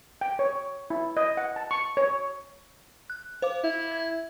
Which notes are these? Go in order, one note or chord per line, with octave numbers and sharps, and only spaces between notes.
G5
C#5
E4
D#5
F#5
A5
C#6
C#5
F#6
C5 F5 D6
E4
G#6